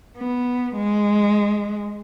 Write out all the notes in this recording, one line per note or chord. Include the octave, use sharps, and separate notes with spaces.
B3
G#3